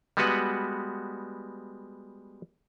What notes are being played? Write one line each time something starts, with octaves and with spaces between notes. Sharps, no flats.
G3 G#3 B3 F#4 B4 F#5